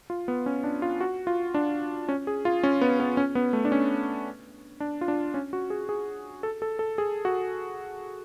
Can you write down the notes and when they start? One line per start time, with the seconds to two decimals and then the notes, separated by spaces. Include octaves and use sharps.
0.10 F4
0.28 B3
0.46 C#4
0.64 D4
0.82 F4
1.01 F#4
1.27 F4
1.54 D4
2.09 C#4
2.27 G#4
2.45 F4
2.63 C#4
2.81 B3
3.00 B3
3.17 C#4
3.35 B3
3.53 A3
3.65 D4
3.72 C#4
4.80 D4
5.01 F4
5.08 D4
5.34 C#4
5.53 F#4
5.70 G#4
5.89 G#4
6.43 A4
6.62 A4
6.79 A4
6.98 G#4
7.25 F#4